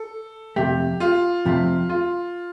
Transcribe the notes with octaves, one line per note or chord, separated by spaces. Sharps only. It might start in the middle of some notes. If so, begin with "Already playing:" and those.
Already playing: A4
F2 C3 A3 G4
F4
F2 C3 F3 A3 C4
F4